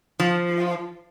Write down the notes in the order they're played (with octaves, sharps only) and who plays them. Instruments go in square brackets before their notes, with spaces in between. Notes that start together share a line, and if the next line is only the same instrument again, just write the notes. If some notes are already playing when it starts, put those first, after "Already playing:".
[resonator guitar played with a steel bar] F3